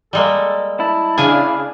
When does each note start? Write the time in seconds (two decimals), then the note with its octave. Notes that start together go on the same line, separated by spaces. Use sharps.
0.13 G3 G#3 A#3 A4
0.80 E4 A5
1.18 C#3 D4 G#4 F5 G#5